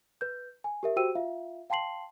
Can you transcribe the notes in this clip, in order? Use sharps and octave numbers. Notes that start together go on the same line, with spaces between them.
B4 G6
G#5
G4 A#4 E5
F#4 G4 C5 G5 E6 D#7
F4 E5 F5
F5 G5 A5 C6 C7 F#7